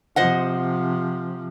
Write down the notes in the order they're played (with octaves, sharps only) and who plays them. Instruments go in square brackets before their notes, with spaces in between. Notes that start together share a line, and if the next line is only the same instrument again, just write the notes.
[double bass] C3 F3 [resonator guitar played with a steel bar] C5 D#5 F#5